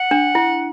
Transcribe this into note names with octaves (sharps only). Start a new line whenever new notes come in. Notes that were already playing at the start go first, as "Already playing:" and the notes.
Already playing: F#5
D4
E4